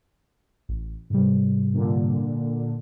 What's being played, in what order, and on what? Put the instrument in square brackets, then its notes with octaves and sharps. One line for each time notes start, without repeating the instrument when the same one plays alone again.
[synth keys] A1
G#2 C3 G3
[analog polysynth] A#2 D3